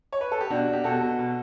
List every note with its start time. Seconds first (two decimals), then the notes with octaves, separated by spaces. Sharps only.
0.12 C#5
0.21 B4
0.32 A4
0.41 G4
0.50 B2 D4 F#4
0.68 B2
0.73 G4
0.84 B2 F#4 A4
1.01 B2
1.19 B2